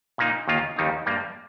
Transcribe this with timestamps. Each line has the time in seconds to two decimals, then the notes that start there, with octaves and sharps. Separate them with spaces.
0.18 A#2 A#3 D#4
0.48 D#2 D#3 A#3 F4
0.76 D#2 D#3 G3 D#4
1.06 G2 G3 A#3